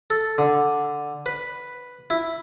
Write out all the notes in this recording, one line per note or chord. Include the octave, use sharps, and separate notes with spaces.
A4
D3
B4
E4